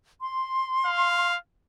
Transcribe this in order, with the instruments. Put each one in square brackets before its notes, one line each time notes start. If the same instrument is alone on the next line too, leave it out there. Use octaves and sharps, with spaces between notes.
[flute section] C6
[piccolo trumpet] F5